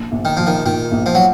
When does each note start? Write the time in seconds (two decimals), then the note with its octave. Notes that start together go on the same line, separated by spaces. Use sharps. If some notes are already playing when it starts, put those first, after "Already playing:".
Already playing: A#1
0.12 A#1
0.25 D#3
0.37 A#2 F3
0.47 D#3
0.65 A#2 D#3
0.92 A#1
1.06 F3
1.15 F#3